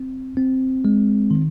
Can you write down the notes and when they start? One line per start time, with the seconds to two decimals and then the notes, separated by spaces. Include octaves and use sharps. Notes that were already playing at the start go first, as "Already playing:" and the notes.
Already playing: C4
0.37 C4
0.85 G#3
1.31 D#3